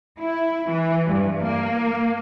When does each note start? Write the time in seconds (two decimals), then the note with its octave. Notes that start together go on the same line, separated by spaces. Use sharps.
0.18 E4
0.70 E3
1.06 G2
1.44 A#3